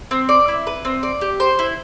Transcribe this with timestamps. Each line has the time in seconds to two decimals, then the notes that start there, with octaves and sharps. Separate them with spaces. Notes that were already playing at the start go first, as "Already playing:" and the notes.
0.11 C4
0.29 D5
0.48 E4
0.67 B4
0.85 C4
1.03 D5
1.21 G4
1.40 C5
1.59 E4